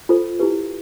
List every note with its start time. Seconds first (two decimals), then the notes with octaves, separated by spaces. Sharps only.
0.09 F4 A4 C5
0.39 E4 G4 B4